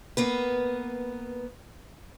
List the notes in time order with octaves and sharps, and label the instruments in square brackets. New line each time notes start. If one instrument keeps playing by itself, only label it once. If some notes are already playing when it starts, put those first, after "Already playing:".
[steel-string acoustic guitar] A#3 B3 B4